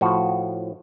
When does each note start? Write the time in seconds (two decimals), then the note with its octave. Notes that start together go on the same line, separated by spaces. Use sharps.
0.01 A2 F3 F#4